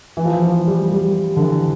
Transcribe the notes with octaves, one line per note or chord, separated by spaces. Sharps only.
E3
F3
E3
F3
G3
G3
D3
E3